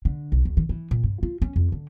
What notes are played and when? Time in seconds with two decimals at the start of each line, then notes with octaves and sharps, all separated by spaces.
0.05 D3
0.32 B1
0.45 D2
0.57 D#3
0.69 E3
0.91 A#2
1.04 G2
1.23 F4
1.42 C#4
1.56 F2
1.72 D3